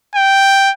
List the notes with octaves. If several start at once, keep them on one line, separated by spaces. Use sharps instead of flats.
G5